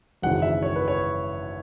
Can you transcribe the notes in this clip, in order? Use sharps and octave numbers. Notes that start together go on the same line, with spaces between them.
G#1 F#2 C#3 E3 F#5
E5
C#5
B4
C#5